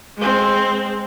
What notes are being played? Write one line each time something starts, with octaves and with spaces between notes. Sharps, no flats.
G#3 C4